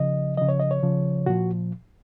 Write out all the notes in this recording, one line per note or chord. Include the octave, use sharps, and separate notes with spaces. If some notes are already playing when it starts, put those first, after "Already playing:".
Already playing: C#3 F3 D#5
C#3 F3 D#5
C#5
D#5
C#5
C#3 F3
A#2 F3 F#4